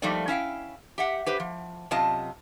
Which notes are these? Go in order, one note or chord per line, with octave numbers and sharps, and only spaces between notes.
F3 G3 A3 A#3 D#4 D5
C#4 E4 F5 G5
G4 E5 F#5
G4 B4 C5
F3
F#2 C3 F4 D#5 A5